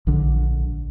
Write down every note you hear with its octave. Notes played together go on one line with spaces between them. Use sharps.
A#1 D3